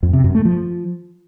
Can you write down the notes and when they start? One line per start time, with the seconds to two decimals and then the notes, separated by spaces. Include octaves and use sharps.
0.03 F2
0.13 C3
0.24 F#2
0.35 A3
0.45 F3